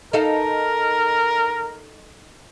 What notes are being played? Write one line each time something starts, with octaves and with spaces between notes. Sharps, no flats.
D#4 A4 A#4 F5